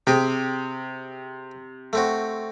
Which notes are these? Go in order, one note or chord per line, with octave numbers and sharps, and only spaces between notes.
C3 C4 G4 G#4
A3 C4 F#4